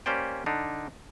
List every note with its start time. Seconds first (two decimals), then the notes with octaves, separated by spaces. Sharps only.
0.06 A#3 C#4 G4 C5 D5 G5
0.46 D3 D4 D#4